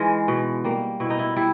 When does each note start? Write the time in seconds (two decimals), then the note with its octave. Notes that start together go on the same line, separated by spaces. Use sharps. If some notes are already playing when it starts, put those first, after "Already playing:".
Already playing: E3 G#3 D#4 F4
0.28 B2
0.64 G3 A#3
1.00 B2 E4
1.10 D#4
1.19 E4
1.36 G3 E4